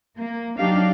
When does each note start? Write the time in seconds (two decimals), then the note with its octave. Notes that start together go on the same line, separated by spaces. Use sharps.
0.17 A#3
0.57 F#3 D4 D#4 G4 F5